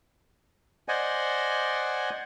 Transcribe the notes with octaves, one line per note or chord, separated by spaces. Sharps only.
C5 D5 D#5 F#5 G#5